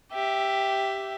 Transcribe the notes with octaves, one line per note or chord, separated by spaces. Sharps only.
G4 E5